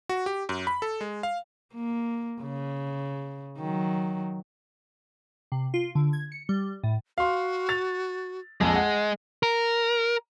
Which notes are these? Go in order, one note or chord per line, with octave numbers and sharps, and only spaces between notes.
F#4
G4
F#2
B5
A4
G#3
F5
A#3
C#3
D#3 F#3
C3
F4
D3
G#6
C#7
G3
A2
F#4 F5 C6
A6 F7
A#1 F2 G#3
F#5
A#4